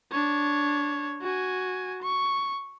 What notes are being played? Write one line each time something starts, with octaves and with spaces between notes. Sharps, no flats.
D4 C#5
F#4 G#5
C#6